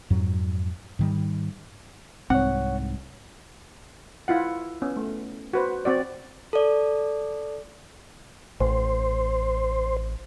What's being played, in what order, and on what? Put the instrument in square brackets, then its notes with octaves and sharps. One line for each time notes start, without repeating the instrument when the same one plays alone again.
[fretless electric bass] F2 G#2 F#3
G#2 D#3 G3
[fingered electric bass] C2 G#2 [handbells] C4 [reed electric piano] C#5 F#5
[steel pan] E4 F4 F#5
B3 C#4
A3
F#4 B4 C5
C4 F#4 D5
[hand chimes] A4 D5
[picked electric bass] A1 [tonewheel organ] C5